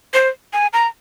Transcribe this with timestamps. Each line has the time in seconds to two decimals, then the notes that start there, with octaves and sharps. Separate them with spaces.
0.14 C5
0.53 G#5
0.73 A#5